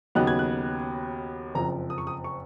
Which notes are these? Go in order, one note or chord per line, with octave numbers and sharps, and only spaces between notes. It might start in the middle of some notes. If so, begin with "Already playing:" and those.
D#2 C#3 F#3 B3 D#4 F#6
G#6
F#6
F#1 F2 F3 A#5
D#6
C#6
D#6
C#6